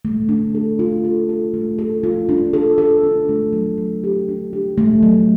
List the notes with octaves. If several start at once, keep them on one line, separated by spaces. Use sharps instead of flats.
A3
D4
A4
F4
A4
A4
A3
A4
F4
D4
A4
A4
D4
A3
F#3
F#3
G4
D4
G4
A3
F#3